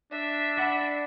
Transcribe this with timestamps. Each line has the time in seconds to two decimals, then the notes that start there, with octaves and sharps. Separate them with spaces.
0.12 D4 E5
0.57 D5 F#5 B5